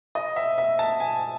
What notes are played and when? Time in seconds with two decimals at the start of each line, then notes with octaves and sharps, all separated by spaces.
0.15 D#5
0.36 E5
0.58 E5
0.79 A5
1.00 G#5